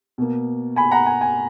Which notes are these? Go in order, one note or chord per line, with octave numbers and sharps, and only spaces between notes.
B2 A#3
G#5 B5
F#5 A#5
G#5
G#5